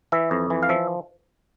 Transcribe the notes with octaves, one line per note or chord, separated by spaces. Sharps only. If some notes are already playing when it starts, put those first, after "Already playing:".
E3 E5
F2
E3
F5
F3 E5